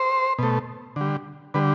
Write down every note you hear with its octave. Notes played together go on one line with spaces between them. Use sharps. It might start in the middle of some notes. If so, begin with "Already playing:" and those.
Already playing: C5
B2 A3
D3 G3
D3 G3 B4